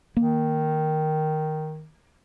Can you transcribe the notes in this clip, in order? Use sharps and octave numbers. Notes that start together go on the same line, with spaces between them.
D#3 A#3